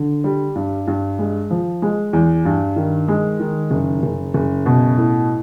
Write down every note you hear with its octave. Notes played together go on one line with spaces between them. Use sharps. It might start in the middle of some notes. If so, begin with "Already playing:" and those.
Already playing: D3
G3
G2
G2
G#3
F3
G#3
E2
G2
D#3
G#3
D#3
F#1
F#1
F#1
B2
A2